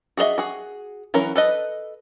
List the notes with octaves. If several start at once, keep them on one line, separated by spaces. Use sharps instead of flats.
F#4 G#4 B4 D#5 E5
F#4 G#4
E3 F#3 C#4 A#4
A4 B4 D#5